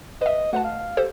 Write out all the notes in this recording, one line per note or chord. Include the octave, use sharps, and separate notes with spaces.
B4 D#5 E5
A3 F#4 B4 A5
F5
G4 A4 C5